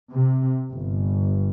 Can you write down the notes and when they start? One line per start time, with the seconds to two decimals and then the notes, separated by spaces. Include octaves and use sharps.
0.11 C3
0.70 G1